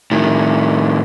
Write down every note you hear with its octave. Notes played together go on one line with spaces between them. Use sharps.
A2 D#3